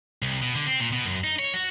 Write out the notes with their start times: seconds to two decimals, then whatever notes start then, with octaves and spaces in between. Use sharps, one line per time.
0.22 C2
0.42 B2
0.55 D3
0.67 C4
0.80 A#2
0.92 B2
1.05 F#2
1.24 D#4
1.39 C#5
1.54 F#4